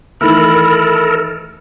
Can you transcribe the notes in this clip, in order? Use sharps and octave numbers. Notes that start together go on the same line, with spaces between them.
D#3 E3 A3 A4 A#4 B5